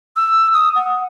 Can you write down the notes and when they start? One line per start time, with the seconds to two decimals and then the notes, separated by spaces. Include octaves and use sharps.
0.16 E6
0.54 D#6
0.75 F#5